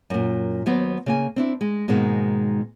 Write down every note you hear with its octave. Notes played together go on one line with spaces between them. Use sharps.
F#2 A#2
D#2 F#3 B3 B4 C5
C#3 A#3 G#5
C4 D4 E4
G#3
G#2 B2 D#3 G#3 A#3